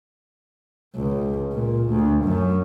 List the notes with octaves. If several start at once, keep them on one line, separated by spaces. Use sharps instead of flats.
C#2
A#2
D2
F#2